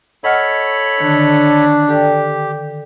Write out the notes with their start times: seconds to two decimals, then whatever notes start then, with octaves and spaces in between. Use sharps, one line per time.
0.24 A4 C#5 D#5 F#5 B5 F6
1.00 D3 D#3 D4
1.89 G4 A4 D5 G5